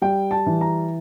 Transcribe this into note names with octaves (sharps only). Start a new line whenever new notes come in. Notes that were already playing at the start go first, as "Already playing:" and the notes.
G3 G5
A5
E3
A#5